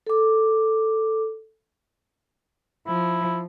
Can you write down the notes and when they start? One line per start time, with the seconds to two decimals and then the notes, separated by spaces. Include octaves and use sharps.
0.07 A4 D6
2.87 F3 E4